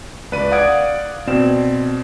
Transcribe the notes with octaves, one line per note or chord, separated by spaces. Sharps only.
C#2 B4 D5 D#7
D5 F5 F#5 D#6 G#6 D7
B2 C4 D5 E7